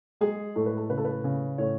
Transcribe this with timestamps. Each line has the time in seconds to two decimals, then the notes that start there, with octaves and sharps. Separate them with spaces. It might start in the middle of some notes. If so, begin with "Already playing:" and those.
0.21 G#3 G#4
0.56 A2 A4
0.66 B4
0.77 A4
0.90 C#3 B4
0.98 A4
1.05 B4
1.24 C#3
1.58 A2 C#5